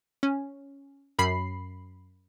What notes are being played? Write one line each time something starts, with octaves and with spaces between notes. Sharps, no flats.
C#4
F#2 B5 C7